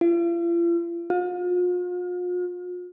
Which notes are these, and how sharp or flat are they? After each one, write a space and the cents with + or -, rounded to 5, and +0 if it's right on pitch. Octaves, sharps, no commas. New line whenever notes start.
F4 -45
F4 +40